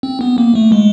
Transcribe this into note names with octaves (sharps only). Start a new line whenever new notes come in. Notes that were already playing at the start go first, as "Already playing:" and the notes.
C4
B3
A#3
A3
G#3